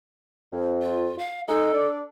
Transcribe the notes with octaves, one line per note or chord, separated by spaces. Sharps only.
F2
F4
F5
G#3 D#4 A4
D4 D5